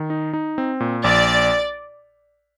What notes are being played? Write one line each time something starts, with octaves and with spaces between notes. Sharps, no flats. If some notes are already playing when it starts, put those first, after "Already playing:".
Already playing: D#3
D#4
D#4
C4
A#2
A#1 D5